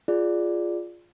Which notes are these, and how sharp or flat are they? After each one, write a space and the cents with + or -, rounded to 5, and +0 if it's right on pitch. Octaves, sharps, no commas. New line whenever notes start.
F4 +0 G#4 +0 D5 +0